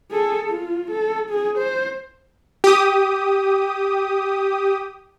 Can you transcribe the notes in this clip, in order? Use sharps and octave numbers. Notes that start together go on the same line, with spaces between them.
G#4 A4
F4
A4
G#4
C5
G4 D#6